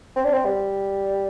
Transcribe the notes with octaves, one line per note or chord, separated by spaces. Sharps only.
C4
D4
C4
G3